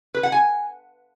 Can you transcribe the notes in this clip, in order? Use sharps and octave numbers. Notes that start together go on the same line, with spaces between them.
B4
F#5
G#5